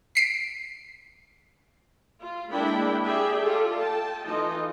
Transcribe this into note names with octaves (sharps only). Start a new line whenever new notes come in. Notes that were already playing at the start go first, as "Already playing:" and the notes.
B6 C7 D7
F4
G#3 A#3 D4 E4 G5 B5
G4 G#4 D5 E5 G5
F4 A4 D5
G5 A5
E3 D#4 F4 A4 D#5